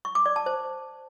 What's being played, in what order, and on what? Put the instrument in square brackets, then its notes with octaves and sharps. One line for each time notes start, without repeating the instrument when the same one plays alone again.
[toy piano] C#6
D6
D5
A5
C5